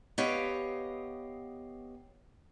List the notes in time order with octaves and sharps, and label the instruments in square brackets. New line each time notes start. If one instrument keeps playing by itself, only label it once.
[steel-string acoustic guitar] B3 G4 C#5 D#5 F5 G5